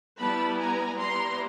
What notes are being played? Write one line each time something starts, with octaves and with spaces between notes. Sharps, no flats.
G3 B3 E4 A5 B5
G#5 A#5
G3 B3 E4 A#5 C6